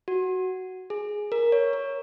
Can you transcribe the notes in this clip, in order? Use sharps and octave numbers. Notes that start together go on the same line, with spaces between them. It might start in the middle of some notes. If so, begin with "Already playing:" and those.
F#4
G#4
A#4
C#5
A#4